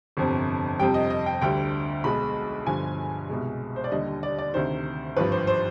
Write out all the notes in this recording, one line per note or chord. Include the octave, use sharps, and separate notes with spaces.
G1 F2 C3
F2 C3 G3 G5
D#5
D#5
G5
D2 D3 G3 G5
B1 B2 G#3 B5
G1 G2 D3 F3 G#5
C2 B2 G#3
C5
D5
D#2 D3 G3 D#5
D5
D5
D2 C3 D#3 C5
G#1 G2 F3 B4
C5
C5